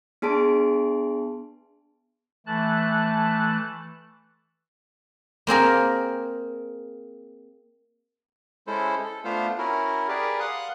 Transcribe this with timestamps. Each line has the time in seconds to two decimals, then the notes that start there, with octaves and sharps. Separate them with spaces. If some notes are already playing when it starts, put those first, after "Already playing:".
0.22 B3 D4 G#4 A5 C6 D7
2.47 E3 A3 A5 F#6
5.47 A#3 C4 G#4 A#4
8.67 G#3 C#4 E4 A4 C5
9.03 A4
9.24 A3 B3 D4 F4 C5 F5
9.58 C#4 E4 F#4 A#4
10.08 G4 G#4 A#4 B4 D5
10.40 F5 F#5 C6 D#6 F#6